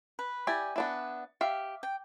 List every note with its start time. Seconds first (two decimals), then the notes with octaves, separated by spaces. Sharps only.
0.19 B4
0.47 E4 G4 D5 G#5
0.76 B3 D4 E4
1.41 G4 E5 F5
1.83 G5